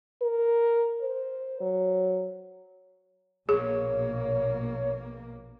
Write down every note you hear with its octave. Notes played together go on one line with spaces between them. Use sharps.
A#4
C5
F#3
A#1 B2 A#3 G#4 C#5